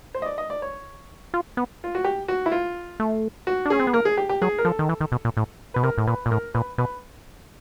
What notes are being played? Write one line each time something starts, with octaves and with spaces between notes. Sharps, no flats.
C5
D#5
D5
D#5
D5
C#5
F4
B3
F4
F#4
G4
F#4
E4
F4
A3
F#4
D4
C#4 G#4
C4
B3
A#3 A#4
G#4
G4
G4
F#3 G#4
A#4
F3 A4
D#3
E3
D#3
B2
A#2
A2
B2 B4
C3 A#4
A2
A#2 B4
A#2
A2 A#4
A#2 B4
B2 B4